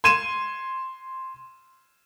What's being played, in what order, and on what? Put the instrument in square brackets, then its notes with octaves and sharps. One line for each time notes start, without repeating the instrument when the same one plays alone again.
[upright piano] C6 G#6 D#7 E7